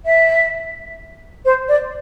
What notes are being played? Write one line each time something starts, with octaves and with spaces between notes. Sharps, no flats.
E5
C5
D5